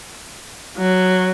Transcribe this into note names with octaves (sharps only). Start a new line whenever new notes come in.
F#3